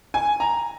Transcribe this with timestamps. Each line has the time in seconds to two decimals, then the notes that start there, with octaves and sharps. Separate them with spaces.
0.14 G#5
0.40 A#5